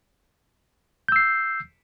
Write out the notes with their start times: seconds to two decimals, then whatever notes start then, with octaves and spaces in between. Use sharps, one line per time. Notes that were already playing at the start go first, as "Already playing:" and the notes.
1.08 G6
1.12 E6
1.16 C7